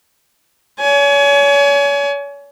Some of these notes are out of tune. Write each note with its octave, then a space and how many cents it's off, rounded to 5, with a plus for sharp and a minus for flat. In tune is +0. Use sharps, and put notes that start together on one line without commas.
C#5 +40 G#5 +30